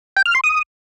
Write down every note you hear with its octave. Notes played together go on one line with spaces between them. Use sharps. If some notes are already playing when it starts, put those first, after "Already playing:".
G5
F6
C6
D#6